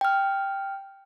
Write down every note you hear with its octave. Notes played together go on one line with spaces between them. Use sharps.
G5 F6